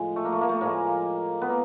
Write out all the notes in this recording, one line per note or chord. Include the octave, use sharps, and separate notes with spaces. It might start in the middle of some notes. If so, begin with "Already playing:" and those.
Already playing: A2 F3 G#3
A3
A#3
A3
A#3
A3
A2 F3 G#3 A#3
B3
A#3